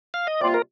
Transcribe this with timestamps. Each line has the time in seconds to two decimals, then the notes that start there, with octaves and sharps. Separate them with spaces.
0.14 F5
0.27 D#5
0.41 C3 G3 A#3 F4 D5
0.54 A#4